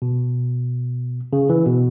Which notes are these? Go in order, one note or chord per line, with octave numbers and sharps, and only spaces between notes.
B2
C#3
E3
B2